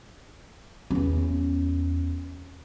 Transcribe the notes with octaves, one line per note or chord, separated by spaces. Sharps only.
E2 C#4